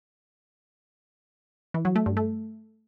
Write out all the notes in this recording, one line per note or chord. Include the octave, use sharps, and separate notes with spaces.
E3
F#3
A3
G2
A3